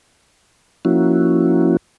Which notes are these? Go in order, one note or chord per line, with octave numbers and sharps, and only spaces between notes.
F3 A#3 C#4 E4 F#4